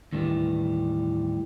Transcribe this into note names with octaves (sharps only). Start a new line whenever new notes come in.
D#2 A2 E3 G3